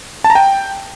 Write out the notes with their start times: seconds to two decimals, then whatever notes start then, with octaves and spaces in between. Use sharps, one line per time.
0.24 A5
0.30 A#5
0.35 G5